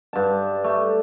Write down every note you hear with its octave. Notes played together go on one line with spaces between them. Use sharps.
G2 A5
A3